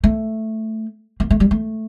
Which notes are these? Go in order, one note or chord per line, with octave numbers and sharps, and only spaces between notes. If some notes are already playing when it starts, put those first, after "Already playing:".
A3
A#3
A3
G3
A3